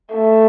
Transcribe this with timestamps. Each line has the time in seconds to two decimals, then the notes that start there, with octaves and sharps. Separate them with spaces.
0.15 A3